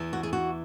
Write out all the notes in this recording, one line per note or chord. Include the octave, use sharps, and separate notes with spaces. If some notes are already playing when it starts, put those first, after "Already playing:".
Already playing: E2 E3
F#4
G#4
F#4